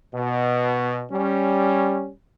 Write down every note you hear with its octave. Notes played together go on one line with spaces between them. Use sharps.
B2
G3 C#4